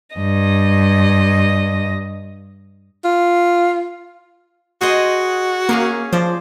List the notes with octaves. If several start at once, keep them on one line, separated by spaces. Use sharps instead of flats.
G2 D#5
F4
F#4 G#4 C5 D#5
A#3 C#4 G#4 F5
F3 C5 D5